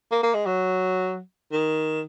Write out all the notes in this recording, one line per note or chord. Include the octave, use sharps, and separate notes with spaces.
A#3
A#3
G#3
F#3
D#3